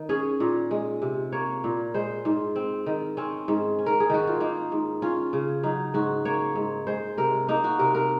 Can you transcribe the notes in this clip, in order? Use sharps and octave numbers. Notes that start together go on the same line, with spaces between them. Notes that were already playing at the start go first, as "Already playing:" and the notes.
Already playing: D#3
C#4 G#4
A#2
G#3
C3
A#3 C#5
A#2
G#3 C5
G#2
C4
D#3
C4 C#4
G#2
C#4
A#4
G#4
D#3 F#4
F4
A#3 D#4
G#2
C#4 F4
C#3
F#3 D#4
G#2 F#4
A#3 C#5
G#2
G#3 C5
C3 A#4
A#3 D#4
F#4
C3 A#4
A#4